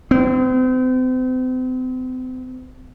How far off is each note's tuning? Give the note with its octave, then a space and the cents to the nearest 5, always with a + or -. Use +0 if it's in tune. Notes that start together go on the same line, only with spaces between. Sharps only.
C4 -40